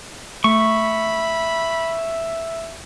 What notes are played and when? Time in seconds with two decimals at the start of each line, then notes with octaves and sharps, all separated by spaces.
0.44 A3 E5 B5 C#6